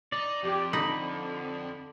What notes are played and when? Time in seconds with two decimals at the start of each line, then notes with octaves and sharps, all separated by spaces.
0.12 D#4 D5
0.43 F2 G4
0.73 D3 D#4 B5